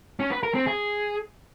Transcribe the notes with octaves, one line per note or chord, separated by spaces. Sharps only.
C#4
B4
A#4
C4
G#4